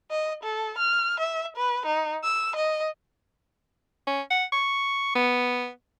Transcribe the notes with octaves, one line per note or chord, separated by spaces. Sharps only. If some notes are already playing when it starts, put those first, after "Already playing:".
D#5
A4
F6
E5
B4
D#4
E6
D#5
C#4
F#5
C#6
B3